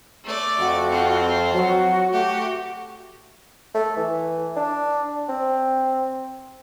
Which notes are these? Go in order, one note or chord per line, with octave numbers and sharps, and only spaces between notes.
A3 D5
F2 F#4
C4 F4
F#3 F#4
A3 F#4 G4
A3
E3
D4
C4